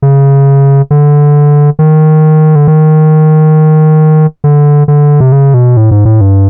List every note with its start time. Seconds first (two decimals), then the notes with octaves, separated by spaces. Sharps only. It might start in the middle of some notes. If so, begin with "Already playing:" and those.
0.02 C#3
0.91 D3
1.79 D#3
2.56 D3
2.68 D#3
4.44 D3
4.88 D3
5.20 C3
5.32 C#3
5.54 B2
5.77 A2
5.91 G#2
6.05 A2
6.21 G2